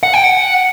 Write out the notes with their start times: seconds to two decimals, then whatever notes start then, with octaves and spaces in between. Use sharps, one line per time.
0.03 F#5
0.14 G5
0.23 F#5